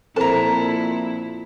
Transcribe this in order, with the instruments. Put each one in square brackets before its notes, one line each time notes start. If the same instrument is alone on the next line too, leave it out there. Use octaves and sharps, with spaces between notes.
[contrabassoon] F2 [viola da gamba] A#2 E4 [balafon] A4 A#4 C5 [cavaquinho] A5 A#5